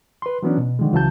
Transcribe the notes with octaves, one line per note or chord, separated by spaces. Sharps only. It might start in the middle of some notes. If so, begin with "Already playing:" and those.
B4 C6
E3 F#3 B3 C#4 D4
B2
D3 D#3 F3 G#3
C#2 C#3 E3 F#3 A5 G6